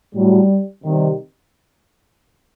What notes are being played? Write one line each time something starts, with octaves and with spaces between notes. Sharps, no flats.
A2 F#3 G3
C3 D#3 G3